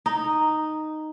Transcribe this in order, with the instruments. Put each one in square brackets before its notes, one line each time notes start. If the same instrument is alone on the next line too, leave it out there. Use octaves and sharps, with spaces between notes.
[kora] D#4